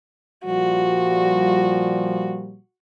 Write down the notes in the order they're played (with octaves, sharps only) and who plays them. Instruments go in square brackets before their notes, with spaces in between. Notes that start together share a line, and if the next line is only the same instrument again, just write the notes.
[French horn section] A#2 F3 G3 [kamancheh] F#4